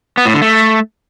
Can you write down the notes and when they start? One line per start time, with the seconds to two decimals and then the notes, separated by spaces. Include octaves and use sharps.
0.17 B3
0.26 A2
0.34 D3
0.42 A3